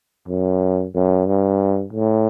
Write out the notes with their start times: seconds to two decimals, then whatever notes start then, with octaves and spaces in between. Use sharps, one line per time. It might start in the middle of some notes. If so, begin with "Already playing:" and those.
0.28 F#2
0.94 F#2
1.27 G2
1.93 A2